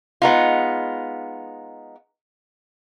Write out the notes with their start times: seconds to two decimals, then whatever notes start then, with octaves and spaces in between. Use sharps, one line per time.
0.22 G#3 B3 D#4 F4